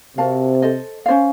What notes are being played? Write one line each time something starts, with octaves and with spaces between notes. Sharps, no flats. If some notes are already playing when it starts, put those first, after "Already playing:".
C3 F#4 A#4 F5 A5
A4 C5 D#5
C#4 F4 C5 F5